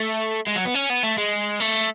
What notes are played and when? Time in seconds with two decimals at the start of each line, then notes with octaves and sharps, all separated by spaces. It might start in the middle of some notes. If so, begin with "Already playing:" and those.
Already playing: A3
0.47 G#3
0.55 F#3
0.65 B3
0.74 C#4
0.90 B3
1.03 A3
1.18 G#3
1.60 A3